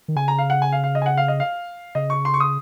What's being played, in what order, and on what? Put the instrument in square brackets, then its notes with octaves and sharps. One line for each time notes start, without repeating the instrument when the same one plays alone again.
[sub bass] D#3
[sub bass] C#3 [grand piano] G#5
[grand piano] A#5
F5
F#5
G#5
F5
F5
D#5
G#5
F#5
F5
D#5
F5
[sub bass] C#3 [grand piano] D#5
[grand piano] C#6
C6
C#6
D#6